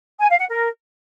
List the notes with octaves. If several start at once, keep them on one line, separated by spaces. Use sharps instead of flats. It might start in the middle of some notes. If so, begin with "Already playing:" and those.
G#5
F5
F#5
A#4